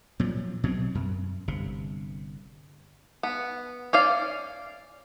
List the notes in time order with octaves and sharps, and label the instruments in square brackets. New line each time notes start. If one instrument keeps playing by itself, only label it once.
[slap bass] A#2 F3 F#3
B2 F#3 G3 C4
F#2
G1 C3
[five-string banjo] B3
C#4 D5 F5